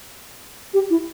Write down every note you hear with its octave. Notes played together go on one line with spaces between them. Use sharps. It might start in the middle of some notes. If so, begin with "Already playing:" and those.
G4
E4